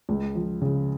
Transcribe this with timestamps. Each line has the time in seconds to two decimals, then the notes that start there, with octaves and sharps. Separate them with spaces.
0.09 C#2
0.35 F3
0.61 C#3